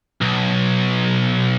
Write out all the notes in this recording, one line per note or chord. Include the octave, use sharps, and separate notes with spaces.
B1